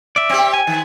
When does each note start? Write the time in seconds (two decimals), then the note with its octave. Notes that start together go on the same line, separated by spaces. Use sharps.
0.16 D5 E5
0.29 C4 G4
0.54 G#5
0.67 D#3